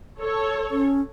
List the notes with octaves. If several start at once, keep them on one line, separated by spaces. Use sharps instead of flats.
A4 C#5
C#4